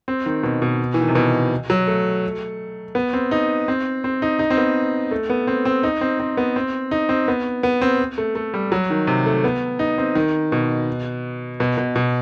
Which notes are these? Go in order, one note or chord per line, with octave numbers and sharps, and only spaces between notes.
C4
D#3
B2
B2
E3
D#3
C3
B2
F#3
A3
B3
C4
D#4
C4
C4
D#4
D#4
C4
B3
A3
B3
C4
C4
D#4
C4
C4
B3
C4
D#4
C4
B3
B3
C4
A3
A3
G3
F#3
D#3
C3
A3
B3
D#4
C4
D#3
B2
B2
B2
B2